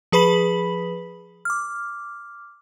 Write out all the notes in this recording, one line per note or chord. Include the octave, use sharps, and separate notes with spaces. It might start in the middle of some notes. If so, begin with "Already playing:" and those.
F3 G#4 B4 B5 B6 F#7
D6 F6